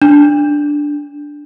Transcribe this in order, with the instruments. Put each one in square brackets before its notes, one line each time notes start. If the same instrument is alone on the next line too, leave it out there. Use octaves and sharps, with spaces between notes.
[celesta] D4